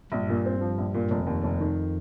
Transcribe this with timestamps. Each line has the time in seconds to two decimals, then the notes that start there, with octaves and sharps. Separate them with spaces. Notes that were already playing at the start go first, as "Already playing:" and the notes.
0.12 A#1 G2
0.29 A#2
0.46 C4
0.61 F3
0.78 A#1
0.94 A#2
1.10 F1 F2
1.27 D#2
1.44 F1
1.60 D#3